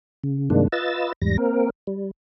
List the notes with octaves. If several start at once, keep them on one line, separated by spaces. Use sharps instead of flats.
C#3
G2 C3 D#3 G#3 A#3 D4
F4 B4 D#5 E6 A6
E2 G#2 G3 A#6
A#3 C4 A#4
G3